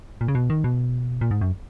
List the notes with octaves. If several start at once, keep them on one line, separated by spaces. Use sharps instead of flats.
A#2
C#3
B2
D#3
B2
A#2
G#2
F#2